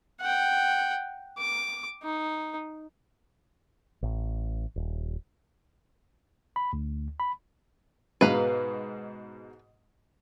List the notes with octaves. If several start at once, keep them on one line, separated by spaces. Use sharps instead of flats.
F#5 G5
D6
D#4
A1
D#1
B5
D2
B5
G#2 B2 G#3 B4 F5 A#5